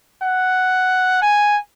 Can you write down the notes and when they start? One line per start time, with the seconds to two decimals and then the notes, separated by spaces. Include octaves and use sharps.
0.23 F#5
1.22 G#5